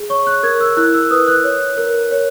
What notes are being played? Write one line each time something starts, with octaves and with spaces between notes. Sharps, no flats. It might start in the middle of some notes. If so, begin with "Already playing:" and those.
Already playing: G#4
C#5 C#6
F#6
A#4 G#6
E6
E4 F#6
E6
B4 D#6
F#6
C#5
A#4
C#5